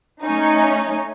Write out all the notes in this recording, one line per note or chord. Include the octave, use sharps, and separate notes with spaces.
A3 C#4 D#4